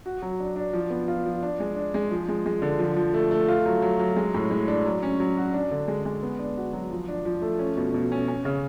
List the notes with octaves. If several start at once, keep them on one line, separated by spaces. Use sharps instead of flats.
F#4
F#3
D4
D4
F3
B3
F4
F3
D4
G#3
D4
G#3
F3
G#3
G#3
D3
F3
F3
A3
A3
F4
F#3
F#3
F#3
G#3
A2
G#3
D4
F#3
C#4
F#3
F#4
D4
D3
G#3
G#3
B3
D4
F#4
F#3
F3
D4
F3
A3
C#4
B2
B2
C#4
C#4
C#3